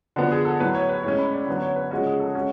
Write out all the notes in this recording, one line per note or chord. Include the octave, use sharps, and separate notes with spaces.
D3 F3 B3 F#4
G#4
A4
A2 F#3 B3 B4
C#5
B4
A2 G#3 C#4 C#5
B5
D5
D3 F#3 B3
C#5
B4
C#3 F3 G#3 C#4 F#4
G#4
A4
G#3 C#4 F#4